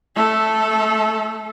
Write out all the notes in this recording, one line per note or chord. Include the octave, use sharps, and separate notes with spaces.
A3 A4